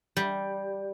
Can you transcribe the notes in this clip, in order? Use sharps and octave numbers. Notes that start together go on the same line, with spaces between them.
G3